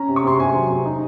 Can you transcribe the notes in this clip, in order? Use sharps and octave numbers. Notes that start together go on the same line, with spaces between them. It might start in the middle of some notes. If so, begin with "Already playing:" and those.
Already playing: C#4 A#5
C3
C#6
C3 C6
C3 G#5
F#3
C3
D#4